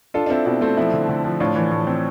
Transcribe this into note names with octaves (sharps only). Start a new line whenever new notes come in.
D4 F4 A4
D4
C4 E4 A4
B2 C4 E4
A3 C4 A4
F3 C4 E4
D3
D3
F3
A2 D4 F4
E3
A2
C4